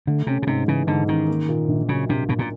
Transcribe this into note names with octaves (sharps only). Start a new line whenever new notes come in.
D3 A3
C3 C#4
B2
G#2 C3
C#3 E3
G#2 D3
D#3 C#4
A#3
A#2
A#1
C#3 F#3
A#1 C3
A#1 B2
A#2